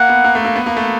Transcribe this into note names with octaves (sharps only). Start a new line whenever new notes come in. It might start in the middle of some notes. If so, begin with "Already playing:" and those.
Already playing: A#3 F#5
B3
A#3
A3
A#3
B3
A#3
A3